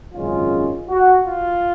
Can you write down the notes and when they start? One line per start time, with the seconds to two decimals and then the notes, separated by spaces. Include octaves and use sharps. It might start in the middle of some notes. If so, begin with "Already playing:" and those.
0.13 G#1 F#2 C#3 G#3 C#4 F4
0.88 F#4
1.26 F4